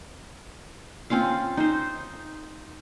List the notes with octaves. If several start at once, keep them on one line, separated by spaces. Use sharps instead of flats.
C4 C#4 F4 F5
D#4 C5